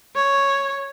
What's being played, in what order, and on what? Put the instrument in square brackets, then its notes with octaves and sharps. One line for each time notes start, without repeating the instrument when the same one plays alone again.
[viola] C#5